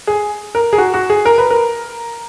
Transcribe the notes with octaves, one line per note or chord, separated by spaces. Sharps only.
G#4
A#4
G#4
F#4
F#4
G#4
A#4
B4
A#4